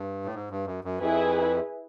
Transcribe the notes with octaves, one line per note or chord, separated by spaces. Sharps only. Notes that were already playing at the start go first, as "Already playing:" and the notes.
Already playing: G2
A2
G#2
G2
F#2
F#2
F2 E4 G#4 B4